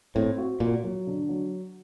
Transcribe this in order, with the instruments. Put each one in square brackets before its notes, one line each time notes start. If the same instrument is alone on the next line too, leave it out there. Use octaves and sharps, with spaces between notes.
[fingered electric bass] A2 [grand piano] C4
[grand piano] F#4
[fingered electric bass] A#2 [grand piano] F#4
[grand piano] F#3
D3
F#3